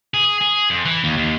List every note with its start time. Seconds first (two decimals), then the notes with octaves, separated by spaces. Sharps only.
0.14 G#4
0.41 G#4
0.70 F2
0.85 E3
1.04 D#2
1.18 D#2